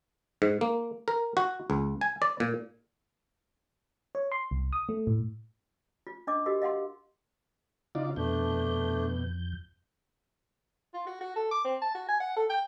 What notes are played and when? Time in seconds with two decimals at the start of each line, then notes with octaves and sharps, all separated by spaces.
0.42 G#2
0.61 A#3
1.08 A#4
1.37 F#4
1.70 C#2
2.01 G#5
2.22 D5
2.40 A#2
4.15 C#5
4.32 C6
4.51 C2
4.73 D#6
4.89 A3
5.07 A2
6.07 F4
6.27 D4 D#5 D6
6.46 F#4 G4 A#4 D#5
6.62 D#5 F5 F#5 C6
7.95 C#3 D#4 F4 F#4 D5
8.16 F2 B2 A3 D4 G6
10.94 F4
11.06 F#4
11.21 F#4
11.36 A4
11.51 D6
11.65 C4
11.82 A5
11.95 F#4
12.08 G#5
12.20 F#5
12.36 A4
12.50 G5